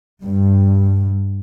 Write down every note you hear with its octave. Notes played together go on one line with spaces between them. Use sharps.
G2